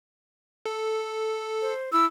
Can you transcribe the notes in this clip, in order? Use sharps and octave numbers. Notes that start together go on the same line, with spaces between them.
A4
C5
E4 E6